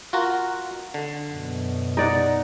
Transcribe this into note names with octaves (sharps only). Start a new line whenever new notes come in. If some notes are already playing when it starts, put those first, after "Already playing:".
F4 F#4 A#4
D3
F#2 B2
D#4 D5 F#5